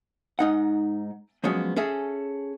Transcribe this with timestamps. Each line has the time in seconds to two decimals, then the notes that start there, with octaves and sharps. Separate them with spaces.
0.39 G#2 D#4 F#5
1.44 F3 F#3 G#3 B3 C#4
1.76 C#4 G#4 A4 E5